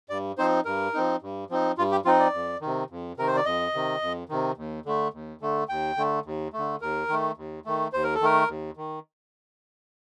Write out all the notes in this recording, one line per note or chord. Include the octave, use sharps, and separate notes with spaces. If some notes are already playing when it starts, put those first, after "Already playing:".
G2 D5
F3 C4 D#4 C5
G2 A#4
F3 C4 D#4
G2
F3 C4 D#4
G2 F4
G4
F3 C4 D#4 F4
D5
F2
C3 D#3
F2
C3 D#3 A#4
C5
D5
F2 D#5
C3 D#3
F2
C3 D#3
D#2
D3 A3
D#2
D3 A3
D#2 G5
D3 A3
D#2
D3 A3
D#2 A#4
D#3 A3
D#2
D#3 A3
D#2 C5
A#4
A4
D#3 A3 A#4
D#2
D#3